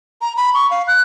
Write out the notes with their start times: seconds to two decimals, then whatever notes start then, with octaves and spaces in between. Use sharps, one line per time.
0.21 A#5
0.37 B5
0.54 C#6
0.71 F5
0.88 F#6